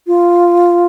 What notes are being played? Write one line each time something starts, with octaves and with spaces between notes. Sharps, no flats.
F4